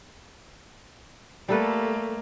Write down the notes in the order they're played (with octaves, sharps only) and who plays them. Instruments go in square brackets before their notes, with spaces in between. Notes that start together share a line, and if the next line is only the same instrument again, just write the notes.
[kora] G3 A4 B4 [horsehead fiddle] A3 A#3